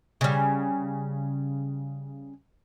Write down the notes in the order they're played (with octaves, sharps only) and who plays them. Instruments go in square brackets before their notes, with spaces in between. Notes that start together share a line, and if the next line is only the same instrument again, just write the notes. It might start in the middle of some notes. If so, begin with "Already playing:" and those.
[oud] C#3 G3